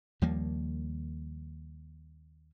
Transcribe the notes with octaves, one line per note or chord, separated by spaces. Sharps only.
D#2 F3 G3 A#3